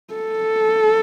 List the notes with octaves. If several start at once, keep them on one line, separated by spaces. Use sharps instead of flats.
A4